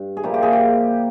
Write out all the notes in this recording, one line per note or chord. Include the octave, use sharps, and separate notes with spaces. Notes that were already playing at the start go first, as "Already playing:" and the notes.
Already playing: G2
G#4
A#2 F3 A#3 E4 G4
G4
G#4
G4